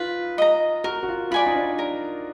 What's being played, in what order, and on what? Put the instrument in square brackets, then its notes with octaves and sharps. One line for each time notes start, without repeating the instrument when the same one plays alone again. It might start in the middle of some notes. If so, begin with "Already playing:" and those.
Already playing: [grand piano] D#4 F4 [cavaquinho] B4
[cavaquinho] D#5 A#5
[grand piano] F#4 [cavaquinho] A#4
[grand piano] F#4
F4
[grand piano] F4 [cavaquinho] D5 G#5 B5
[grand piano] D#4
D4
[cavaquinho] A#4